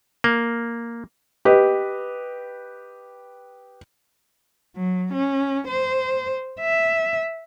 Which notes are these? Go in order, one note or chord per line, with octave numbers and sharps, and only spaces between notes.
A#3
G4 B4 D#5
F#3
C#4
C5
E5